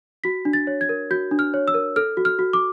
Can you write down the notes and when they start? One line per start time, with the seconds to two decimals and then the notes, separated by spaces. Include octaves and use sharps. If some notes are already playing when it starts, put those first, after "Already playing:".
0.24 F#4 B6
0.45 D4
0.53 A6
0.67 C#5
0.81 G#6
0.89 A#4
1.11 F#4 G6
1.31 D4
1.39 F6
1.54 C#5
1.68 E6
1.74 A#4
1.96 A4 F6
2.17 F#4
2.25 F6
2.39 F#4
2.53 D6